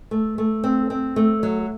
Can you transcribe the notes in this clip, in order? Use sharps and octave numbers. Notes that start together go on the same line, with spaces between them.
A3
A3
C4
C4
A3
F#3